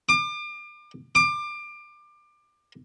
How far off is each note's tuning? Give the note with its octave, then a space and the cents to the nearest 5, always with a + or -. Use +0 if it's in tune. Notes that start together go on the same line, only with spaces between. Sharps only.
D6 +35
D6 +25